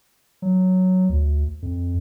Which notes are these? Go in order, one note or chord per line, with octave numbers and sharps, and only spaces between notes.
F#3
D2
F2